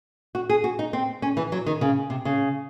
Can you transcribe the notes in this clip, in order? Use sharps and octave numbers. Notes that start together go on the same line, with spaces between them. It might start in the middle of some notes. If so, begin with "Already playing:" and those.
F#4
G#4
F#4
D#4
C4
C#4
E3
F#3
D#3
C#3
C3
C#3